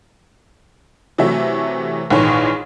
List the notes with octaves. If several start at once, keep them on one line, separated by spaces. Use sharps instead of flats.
C3 E3 F#3 A3 E5
A#1 G#2 D#3 E3 B4 C#5